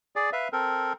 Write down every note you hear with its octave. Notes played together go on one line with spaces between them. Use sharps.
G#4 D5
B4 E5 F5
C4 A4 A#4